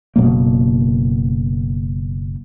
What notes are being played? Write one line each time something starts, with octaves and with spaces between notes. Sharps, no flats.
F#1 B2 F#3 A#3